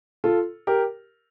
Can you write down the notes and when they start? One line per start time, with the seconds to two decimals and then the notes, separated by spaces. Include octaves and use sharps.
0.24 F4 A4
0.67 G4 A#4